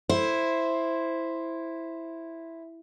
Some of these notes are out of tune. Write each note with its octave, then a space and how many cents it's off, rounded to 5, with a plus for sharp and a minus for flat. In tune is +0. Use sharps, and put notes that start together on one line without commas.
E4 +0 C5 +0